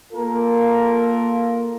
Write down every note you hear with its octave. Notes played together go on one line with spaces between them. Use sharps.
A#3 F4 A4 A#4